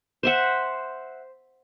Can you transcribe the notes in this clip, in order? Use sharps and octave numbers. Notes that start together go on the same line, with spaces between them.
C5 E5 F#5